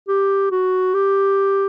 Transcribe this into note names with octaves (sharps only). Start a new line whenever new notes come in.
G4
F#4
G4